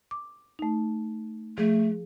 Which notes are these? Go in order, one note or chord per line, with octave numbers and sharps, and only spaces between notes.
D6
A3 D#4
F3 A3 G#4